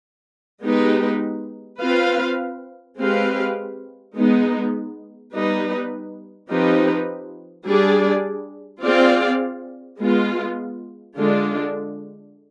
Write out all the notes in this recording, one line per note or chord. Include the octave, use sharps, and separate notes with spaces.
G#3 B3 D#4 G4 B4
C4 F4 B4 F5
G#3 C4 G4 B4 F5
G#3 B3 D#4
G3 B3 D#4 B4
F3 C4 D#4 G4 B4
G3 D4 G#4 D5
C4 F4 G#4 D5 F5
G#3 B3 F4
D3 G#3 D4 F4